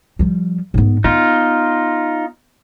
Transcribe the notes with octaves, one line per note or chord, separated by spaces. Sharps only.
F3 G3
G#2 B3
B3 D#4 F4